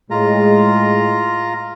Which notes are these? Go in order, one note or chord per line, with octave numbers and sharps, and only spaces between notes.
A2 G#3 F4 A#5